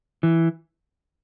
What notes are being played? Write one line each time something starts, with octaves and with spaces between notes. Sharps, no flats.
E3